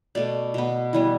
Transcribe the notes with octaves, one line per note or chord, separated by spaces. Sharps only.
B2 A3 D5
B2 B3
E3 G3 B3